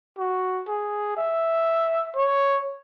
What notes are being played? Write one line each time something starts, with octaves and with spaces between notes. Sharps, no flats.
F#4
G#4
E5
C#5